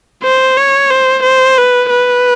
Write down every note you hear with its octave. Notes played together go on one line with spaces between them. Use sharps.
C5
C#5
C5
C5
B4
B4